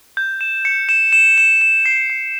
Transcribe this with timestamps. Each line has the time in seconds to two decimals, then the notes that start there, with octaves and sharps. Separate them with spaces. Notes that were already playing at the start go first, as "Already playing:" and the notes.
0.17 G6
0.41 E7
0.65 C#7
0.89 E7
1.13 E7
1.38 E7
1.61 E7
1.86 C7
2.10 C7